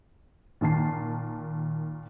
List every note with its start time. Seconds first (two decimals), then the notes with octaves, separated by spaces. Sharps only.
0.61 A#2 D#3 A5 C7